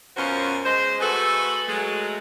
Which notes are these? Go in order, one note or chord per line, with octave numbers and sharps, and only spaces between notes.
F#2 B2 C#4 F4 F#4 C5
G#3 C5 D#5
A3 F#4 G#4 A4 B4
F#3 G#3 A3